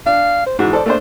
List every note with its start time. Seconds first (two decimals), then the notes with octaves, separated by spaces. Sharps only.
0.06 D4 F5
0.47 C5
0.59 G#2 E3 F#4
0.73 A4 C5 D5
0.86 A3 A#3 D4 C5